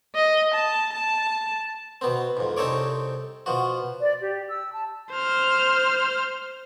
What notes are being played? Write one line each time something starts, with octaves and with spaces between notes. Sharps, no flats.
D#5
A5
A5
B2 B3 C4
F2 G#2
C2 C4 D#4 A4 C#5 D6
B2 F3 F#4
D5
G4
E6
A5
C5 F6